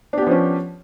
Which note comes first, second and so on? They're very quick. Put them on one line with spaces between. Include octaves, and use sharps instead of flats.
D4 G4 B3 F3 C#4